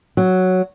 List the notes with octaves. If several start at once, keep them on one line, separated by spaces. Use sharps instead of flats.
F#3